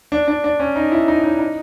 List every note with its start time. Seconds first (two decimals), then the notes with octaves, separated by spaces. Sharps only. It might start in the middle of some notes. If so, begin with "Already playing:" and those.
0.12 D4
0.28 D4
0.44 D4
0.60 C#4
0.76 D#4
0.92 E4
1.08 D#4
1.23 D#4
1.39 D#4